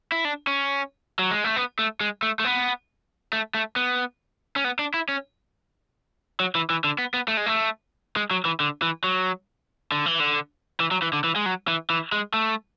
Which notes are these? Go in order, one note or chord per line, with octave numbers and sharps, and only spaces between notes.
E4
D4
C#4
F#3
G#3
A3
B3
A3
G#3
A3
A3
B3
A3
A3
B3
C#4
B3
D4
E4
C#4
F#3
E3
E3
D3
B3
B3
A3
G#3
A3
G#3
F#3
E3
D3
E3
F#3
D3
E3
D3
E3
F#3
E3
D3
E3
G#3
F#3
E3
E3
G#3
A3